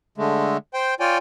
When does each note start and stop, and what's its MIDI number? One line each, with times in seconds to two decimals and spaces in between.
0.18 0.57 50
0.18 0.57 56
0.18 0.57 57
0.74 0.94 72
0.74 0.94 79
1.00 1.18 65
1.00 1.18 73
1.00 1.18 74
1.00 1.18 79
1.00 1.18 80